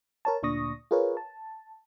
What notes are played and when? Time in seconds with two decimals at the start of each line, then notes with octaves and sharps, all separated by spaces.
0.25 A#4 C#5 A5
0.43 D2 A#2 D4 C#6 D#6 A#6
0.91 F4 G#4 A#4 B4 C#5
1.17 A5